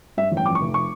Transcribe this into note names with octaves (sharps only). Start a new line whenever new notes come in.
G2 E5
A1
G5
F2 D6
C#6
F1
C#6